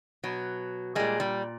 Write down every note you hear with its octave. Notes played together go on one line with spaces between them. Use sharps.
B2 F#3
A#2 G3 G#3
G3